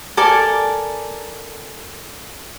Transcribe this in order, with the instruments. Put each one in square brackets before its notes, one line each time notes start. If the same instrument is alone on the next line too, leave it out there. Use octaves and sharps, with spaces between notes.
[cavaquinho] A4 A#4 D5 G#5